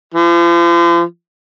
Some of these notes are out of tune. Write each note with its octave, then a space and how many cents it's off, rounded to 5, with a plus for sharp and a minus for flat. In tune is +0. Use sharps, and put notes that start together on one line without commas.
F3 -40